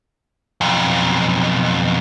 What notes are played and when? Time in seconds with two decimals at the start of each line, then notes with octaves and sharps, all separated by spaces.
0.61 B1 F2